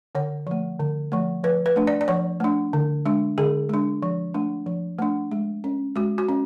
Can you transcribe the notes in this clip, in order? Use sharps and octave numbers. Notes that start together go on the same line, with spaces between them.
D3 C#5
F3 A3
D3
F3 A3
F3 B4
B4
A3 D4
D5
D5
F3 C#5
A3 D4
D3
G#3 D4
D3 G#4
G#3 D4
F3
A3 D4
F3
A3 D4
G#3
C#4
G#3 F#4
F#4
C#4